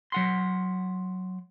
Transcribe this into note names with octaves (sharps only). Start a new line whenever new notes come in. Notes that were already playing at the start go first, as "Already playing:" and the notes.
F#3 F#5 C6